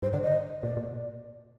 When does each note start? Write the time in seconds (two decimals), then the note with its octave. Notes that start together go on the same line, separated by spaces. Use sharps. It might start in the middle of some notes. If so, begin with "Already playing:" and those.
0.02 G2 C5
0.13 D3 D5
0.23 D#5
0.62 A#2 D5
0.77 A#2